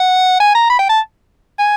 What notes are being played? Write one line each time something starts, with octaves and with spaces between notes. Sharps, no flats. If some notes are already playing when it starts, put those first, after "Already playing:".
Already playing: F#5
G#5
A#5
B5
G5
A5
G#5